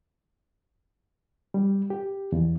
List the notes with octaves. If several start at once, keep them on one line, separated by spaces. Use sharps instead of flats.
G3
G4
E2